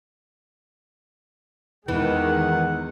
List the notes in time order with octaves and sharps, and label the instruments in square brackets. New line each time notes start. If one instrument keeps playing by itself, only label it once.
[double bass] E2 G#3 [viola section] D#3 G#4 [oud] E3 [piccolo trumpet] F#5